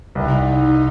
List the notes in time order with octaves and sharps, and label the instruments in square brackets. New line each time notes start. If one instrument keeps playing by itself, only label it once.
[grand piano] C2 [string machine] D#4